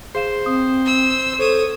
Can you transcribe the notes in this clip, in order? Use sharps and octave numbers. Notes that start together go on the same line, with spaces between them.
G#4 C5 F5 E7
C4 D#6
E6
A4 C5 C#5 D#6 E7